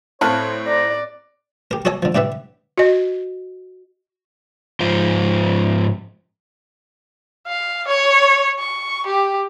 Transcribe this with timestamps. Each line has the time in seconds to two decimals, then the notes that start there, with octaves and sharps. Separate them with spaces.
0.21 A2 C4 C#5 F5 A5 B5 F#6
0.67 D5 A#5
1.71 G4 A#4
1.85 F#4 A4 C#5 D#5 G#5
2.03 D3 F3
2.15 A2 D3 G4 B4 E5
2.78 F#4 D#5
4.80 G#2 F3 F4 C5
7.47 F5
7.87 C#5
8.59 C#6
9.06 G4